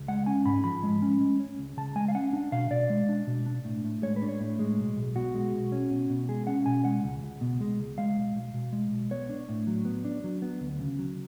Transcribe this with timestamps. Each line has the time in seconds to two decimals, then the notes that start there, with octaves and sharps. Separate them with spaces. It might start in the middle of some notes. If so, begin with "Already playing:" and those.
Already playing: C#2
0.08 G#3 F#5
0.26 C#4 G#5
0.45 G#2 B5
0.64 F3 B5
0.83 G#3
1.02 C#4
1.21 G#3
1.40 C#4
1.59 C#2
1.77 C#3 A5
1.96 G#3 G#5
2.08 F5
2.15 C#4 F#5
2.33 D4
2.52 B2 F5
2.71 B2 D5
2.90 G#3
3.09 D4
3.27 B2
3.46 D4
3.65 A2
3.85 A2
4.03 G#3 C#5
4.16 B4
4.22 D4
4.29 C#5
4.40 A2
4.59 G#3
4.78 B1
4.96 B1
5.15 B2 F#4
5.34 G#3
5.53 B1
5.72 C#4
5.91 B2
6.10 B2
6.29 G#3 G#4
6.47 C#4 F#5
6.66 B2 G#5
6.85 G#3 F#5
7.04 C#2
7.23 C#2
7.41 B2
7.61 G#3
7.78 C#2
7.98 G#3 F5
8.17 B1
8.35 B1
8.54 B2
8.73 G#3
8.92 B1
9.11 B3 C#5
9.29 D4
9.49 A2
9.67 F#3
9.85 B3
10.05 D4
10.24 F#3
10.42 B3
10.61 D2
10.80 C#3
10.99 F#3